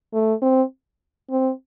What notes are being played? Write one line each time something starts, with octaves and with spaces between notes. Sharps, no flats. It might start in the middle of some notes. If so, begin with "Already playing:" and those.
A3
C4
C4